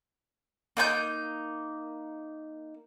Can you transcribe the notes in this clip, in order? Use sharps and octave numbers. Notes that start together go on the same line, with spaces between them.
A#3 D#4 G#5 G6